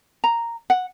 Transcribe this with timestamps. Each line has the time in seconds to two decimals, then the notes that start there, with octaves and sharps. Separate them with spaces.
0.24 A#5
0.70 F#5